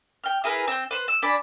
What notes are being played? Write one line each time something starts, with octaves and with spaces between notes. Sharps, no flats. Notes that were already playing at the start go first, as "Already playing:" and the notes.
G5 F6
E4 G#4 A#4 B4
C4 G6
B4 C5
E6
D4 G#5 B5